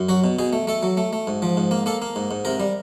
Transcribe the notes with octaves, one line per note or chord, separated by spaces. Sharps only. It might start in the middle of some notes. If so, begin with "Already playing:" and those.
Already playing: F#2
F#3 F#4
B2
B2 G#4
A3
A3 A4
F#3
A3
A3
G#2
F3
G#2
A#3
A#3 A4
A#3
G#2
G#2
C3 A#4
G3